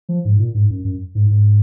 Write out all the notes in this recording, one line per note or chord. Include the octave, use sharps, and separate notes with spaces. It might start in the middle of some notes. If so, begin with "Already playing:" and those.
F3
G#2
A#2
G#2
F#2
F#2
G#2
G#2